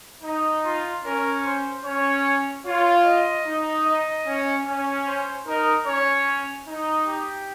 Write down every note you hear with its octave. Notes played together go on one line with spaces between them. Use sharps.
D#4
F4
C#4 A#4
C5
C#4 C#5
F4 C#5
D#5
D#4
D#5
C#4
C#4
C5
D#4 A#4
C#4 C#5
D#4
G4